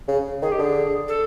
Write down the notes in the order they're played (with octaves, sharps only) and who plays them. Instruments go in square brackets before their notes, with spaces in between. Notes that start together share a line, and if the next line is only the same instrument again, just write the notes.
[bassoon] C#3
[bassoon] D#3 [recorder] G#4
[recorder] G4
[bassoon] D3 [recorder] G#4
[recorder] A4